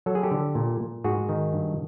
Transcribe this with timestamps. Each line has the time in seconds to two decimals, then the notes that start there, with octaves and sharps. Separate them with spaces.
0.06 F#3 A4
0.15 G#4
0.23 G4 A4
0.31 D3
0.55 A#2
0.80 A#2
1.04 G#2 F#4 G#4
1.29 D#3
1.53 G2